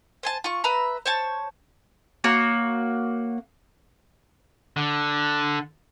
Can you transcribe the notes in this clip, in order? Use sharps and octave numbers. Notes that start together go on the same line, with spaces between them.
C5 G#5 A5
F4 C#6
B4 E5 A#5 B5
C5 C#5 A5
A#3 F#4 C#5
D3